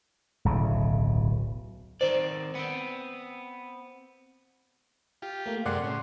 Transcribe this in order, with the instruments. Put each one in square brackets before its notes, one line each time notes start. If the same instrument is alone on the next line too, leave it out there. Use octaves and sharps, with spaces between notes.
[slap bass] D1 B1 C#3
[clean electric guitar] D#3 C4 D5 [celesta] C5
[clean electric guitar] B3 C4
[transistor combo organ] F4 G4
[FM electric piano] A3 A#3
[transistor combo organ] F#2 C3 G#3 [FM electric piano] D5 F#5 C6
[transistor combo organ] A2 C#3